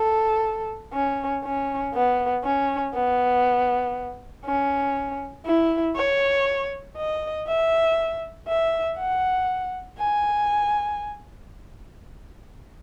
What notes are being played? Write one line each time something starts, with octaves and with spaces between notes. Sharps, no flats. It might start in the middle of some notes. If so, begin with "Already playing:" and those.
Already playing: A4
C#4
C#4
B3
C#4
B3
C#4
E4
C#5
D#5
E5
E5
F#5
G#5